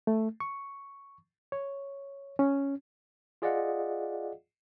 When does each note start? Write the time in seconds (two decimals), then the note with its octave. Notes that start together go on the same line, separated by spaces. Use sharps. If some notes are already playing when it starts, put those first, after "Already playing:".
0.07 A3
0.40 C#6
1.52 C#5
2.39 C#4
3.42 F4 G#4 D5 D#5 F5 F#5